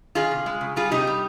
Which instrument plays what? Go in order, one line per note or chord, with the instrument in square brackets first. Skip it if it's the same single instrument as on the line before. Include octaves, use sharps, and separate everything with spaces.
[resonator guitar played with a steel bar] D#3 F4 G#4
C3
G#3
C#3
G3 F4 G#4
C3 D#4 G4
G3